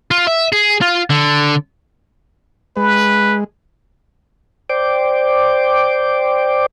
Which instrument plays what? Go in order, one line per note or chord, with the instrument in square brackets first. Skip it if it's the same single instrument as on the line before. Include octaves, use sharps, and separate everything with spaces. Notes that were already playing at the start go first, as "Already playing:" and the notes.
[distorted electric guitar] F4
E5
G#4
F4
D3
[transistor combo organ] G#3 [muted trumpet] B4
[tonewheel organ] C5 D5 G5 D6